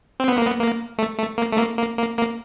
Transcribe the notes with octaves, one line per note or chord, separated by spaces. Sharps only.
C4
B3
A#3
B3
A#3
A3
A3
A#3
A3
A#3
A#3
A#3
A#3